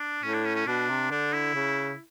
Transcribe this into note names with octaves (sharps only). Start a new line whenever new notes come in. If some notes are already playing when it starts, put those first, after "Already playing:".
Already playing: D4
A2 C#4
D4
C#4
C#4
B2 D4
C3
D3 D4
E4
C#3